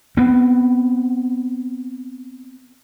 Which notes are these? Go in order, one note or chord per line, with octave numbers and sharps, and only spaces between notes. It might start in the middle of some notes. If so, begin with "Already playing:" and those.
B3 C4